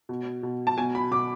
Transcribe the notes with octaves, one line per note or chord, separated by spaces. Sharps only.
B2
B2
A5
B2 G#5
B5
B2 D6